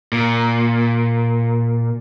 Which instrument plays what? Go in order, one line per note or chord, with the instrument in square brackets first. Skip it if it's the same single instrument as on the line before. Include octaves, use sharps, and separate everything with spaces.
[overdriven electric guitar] A#2